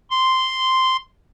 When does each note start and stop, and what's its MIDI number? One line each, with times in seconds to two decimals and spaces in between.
0.11 0.97 84